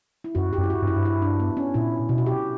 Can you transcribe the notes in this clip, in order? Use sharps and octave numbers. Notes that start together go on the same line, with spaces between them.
E4
F#2 F#4
G4
F#2
E4
F#4
G2
F#2 E4
G2
E4
D4
B3
C#4
A#2 E4
B2 E4
F#4
G4